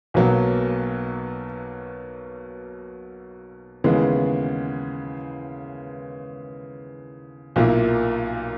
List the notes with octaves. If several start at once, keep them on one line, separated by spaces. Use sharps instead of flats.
B1 B2 F#3 A#3
D#2 C#3 E3 G#3 B3
B1 A#2 A#3 E4